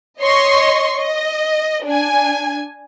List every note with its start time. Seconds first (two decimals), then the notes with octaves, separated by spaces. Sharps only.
0.21 C#5 D#5 C6 C#6
0.97 D#5
1.86 D4 G#5